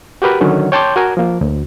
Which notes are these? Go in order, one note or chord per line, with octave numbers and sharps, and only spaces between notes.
F#4 G4 A#4 B4
D3 D#3 F#3 C#4
C#5 G5 A5 C6 D6 G6
F#4 A#4 G#5 A#5
F3 A#3
D2